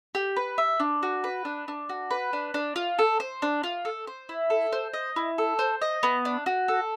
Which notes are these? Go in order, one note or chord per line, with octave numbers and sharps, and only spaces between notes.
G4
B4
E5
D4
F#4
B4
D4
D4
F#4
B4
D4
D4
F4
A4
C5
D4
F4
A4
C5
E4
A4
C5
D#5
E4
A4
C5
D#5
B3
D4
F#4
A4